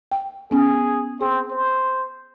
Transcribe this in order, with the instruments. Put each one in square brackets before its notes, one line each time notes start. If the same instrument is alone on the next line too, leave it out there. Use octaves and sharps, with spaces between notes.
[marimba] G5
[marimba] B3 C#4 [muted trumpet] G#4
[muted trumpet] C4 [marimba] G#4
[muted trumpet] C5